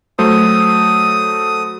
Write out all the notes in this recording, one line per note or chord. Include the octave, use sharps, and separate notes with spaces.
F#3 A3 C5 D#6